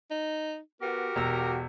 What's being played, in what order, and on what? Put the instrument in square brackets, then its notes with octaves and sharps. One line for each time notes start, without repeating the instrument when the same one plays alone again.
[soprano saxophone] D#4
[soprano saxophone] B3 [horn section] F#4 G4 [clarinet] A#4
[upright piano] E1 E6 [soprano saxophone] A#5